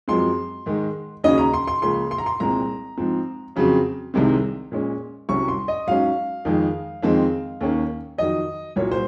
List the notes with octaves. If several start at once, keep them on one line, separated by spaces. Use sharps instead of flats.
F#2 F3 G#3 C4 C6
G#2 D#3 G#3
D#2 C#3 F#3 C#4 D#5
A#5
C6
C6
C#2 C#3 F3 A#3 C#4 C6
C6
A#5
C6
C2 A#2 G#3 C4 A#5
G#2 F3 C4
F2 C#3 F#3 C4
C2 C3 D#3 G#3 C4
A#2 G#3 C#4
C2 C3 F#3 C#4 C#6
C6
D#5
G#2 F#3 C#4 F5
F2 D#3 G#3
F2 D#3 G#3 C4
D#2 D#3 A#3 C#4
F2 D#3 F#3 D#5
C2 A#2 F#3 C#5
C5